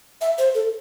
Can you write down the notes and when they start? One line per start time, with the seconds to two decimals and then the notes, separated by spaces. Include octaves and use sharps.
0.21 E5
0.38 C5
0.55 A4